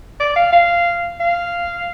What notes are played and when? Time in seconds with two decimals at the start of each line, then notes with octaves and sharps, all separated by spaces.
0.20 D5
0.36 F5
0.53 F5
1.20 F5